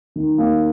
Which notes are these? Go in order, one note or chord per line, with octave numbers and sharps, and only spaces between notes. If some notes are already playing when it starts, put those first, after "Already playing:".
D#3
A#3